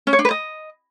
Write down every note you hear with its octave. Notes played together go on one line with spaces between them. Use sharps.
C#4
C#5
D4
B4
D#5